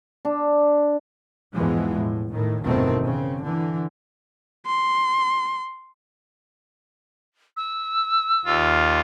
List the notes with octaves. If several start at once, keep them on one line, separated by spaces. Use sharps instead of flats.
D4
E2 G#2 B2 E3 F3 G#3
A2
A2 D#3
G1 E2 B2 D#3 A3 C4
C#3 C4
D3 E3
C6
E6
D#2 F4